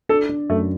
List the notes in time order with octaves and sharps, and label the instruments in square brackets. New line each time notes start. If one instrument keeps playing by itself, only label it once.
[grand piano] D4 [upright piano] A4
[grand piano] D4
[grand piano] F#2 [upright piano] A3